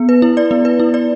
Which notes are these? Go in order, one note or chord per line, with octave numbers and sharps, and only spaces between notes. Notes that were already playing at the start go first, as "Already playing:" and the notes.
Already playing: B3
B4
E4
D5
B3
B4
E4
D5